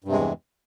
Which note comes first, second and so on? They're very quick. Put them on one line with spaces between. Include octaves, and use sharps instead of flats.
G2 C3 G#3 E2 E3